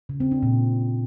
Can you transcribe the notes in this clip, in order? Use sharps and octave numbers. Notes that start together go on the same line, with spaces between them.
C#3
C4
D4
A#2